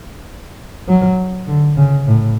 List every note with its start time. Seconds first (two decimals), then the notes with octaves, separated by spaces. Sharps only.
0.88 F#3
1.48 D3
1.77 C#3
2.06 A2